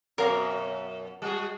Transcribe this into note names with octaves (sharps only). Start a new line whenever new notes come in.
F#2 B2 A#4 F5 D6
G3 F#4 G#4